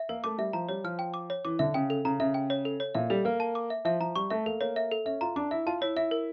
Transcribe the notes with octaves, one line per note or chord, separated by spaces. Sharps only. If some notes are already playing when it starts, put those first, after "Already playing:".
Already playing: E5
A#3 A#4
A3 D6
G3 E5
F3 A#5
G3 C#5
F3 F6
G5
D6
C#5
E3 D6
D3 E5
C#3 G5
A4
C#3 A#5
C#3 E5
G5
C#5
A4
C#5
A#2 E5
G3 A4
A#3 F6
A5
D6
E5
F3 E5
F3 A#5
G3 C#6
A3 E5
A#3 A4
A#3 C#5
E5
A4
C#4 E5
F4 A#5
D4 D6
E4 E5
F4 A5
E4 C#5
E4 E5
A#4